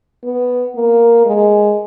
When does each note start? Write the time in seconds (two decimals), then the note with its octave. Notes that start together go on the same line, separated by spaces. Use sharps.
0.24 B3
0.75 A#3
1.26 G#3